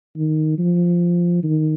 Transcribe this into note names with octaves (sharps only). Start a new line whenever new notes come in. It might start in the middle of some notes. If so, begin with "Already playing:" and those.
D#3
F3
D#3